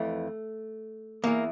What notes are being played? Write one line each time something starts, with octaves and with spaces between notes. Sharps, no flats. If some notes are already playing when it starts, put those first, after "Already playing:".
Already playing: F2 E3 A3
E2 E3 A#3